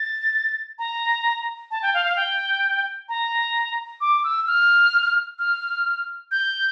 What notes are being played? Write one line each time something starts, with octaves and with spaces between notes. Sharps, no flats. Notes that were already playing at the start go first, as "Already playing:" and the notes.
Already playing: A6
A#5
A5
G5
F5
F5
G5
A#5
D6
E6
F6
F6
G6